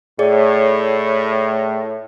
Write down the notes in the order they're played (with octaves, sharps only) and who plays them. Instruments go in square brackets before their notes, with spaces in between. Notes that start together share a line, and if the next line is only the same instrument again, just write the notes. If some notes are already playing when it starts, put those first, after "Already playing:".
[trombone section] A2 [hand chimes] G#4 C#5 D5